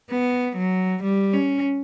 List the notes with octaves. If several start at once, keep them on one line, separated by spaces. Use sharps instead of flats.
B3
F#3
G3
C#4